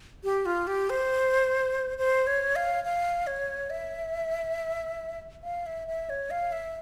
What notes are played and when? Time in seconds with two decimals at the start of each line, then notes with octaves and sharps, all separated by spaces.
0.24 G4
0.45 F4
0.67 G4
0.90 C5
1.98 C5
2.27 C#5
2.56 F5
2.84 F5
3.27 C#5
3.70 E5
5.43 F5
5.66 E5
5.87 E5
6.09 C#5
6.31 F5
6.52 E5